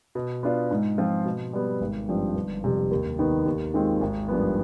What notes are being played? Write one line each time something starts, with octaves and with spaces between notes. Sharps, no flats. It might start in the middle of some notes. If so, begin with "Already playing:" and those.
B2
B3 D4 F4
G#2
F3 C4 F4
B2
G3 B3
G#1
G2 F3 C4
G1
F2 C3
D#2
D#3 B3 D#4
D#2
D#3 G#3 C4 F4
G#1
G2 F3 B3